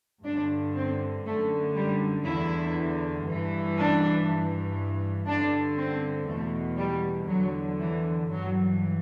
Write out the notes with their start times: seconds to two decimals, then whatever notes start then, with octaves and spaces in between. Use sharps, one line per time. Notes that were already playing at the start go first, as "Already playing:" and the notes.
0.25 G2 D3 D4
0.75 C4
1.25 F#2 D3 A3
1.76 G3
2.25 E2 D3 E4
3.26 G2 E3
3.76 D4
4.27 G2 E3
5.27 G2 D3 D4
5.77 C4
6.28 E2 B2 A3
6.78 G3
7.28 E2 D3 F#3
7.79 E3
8.28 G2 E3 F#3